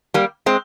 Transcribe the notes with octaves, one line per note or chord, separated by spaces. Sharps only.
G3 A#3
G#3 C4